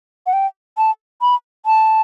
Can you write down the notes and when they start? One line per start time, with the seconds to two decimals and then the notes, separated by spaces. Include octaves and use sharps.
0.26 F#5
0.33 G5
0.77 A5
1.22 B5
1.66 A5